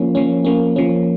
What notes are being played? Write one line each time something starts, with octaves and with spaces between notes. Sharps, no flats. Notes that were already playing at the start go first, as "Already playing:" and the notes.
Already playing: F3 A#3 C#4
F3 A#3 C#4
F3 A#3 C#4
F3 A#3 C#4